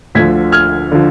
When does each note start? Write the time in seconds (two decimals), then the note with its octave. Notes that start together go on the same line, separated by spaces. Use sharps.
0.15 D2 D3 F3 G#6 B6
0.52 F6 G#6
0.92 D3 F3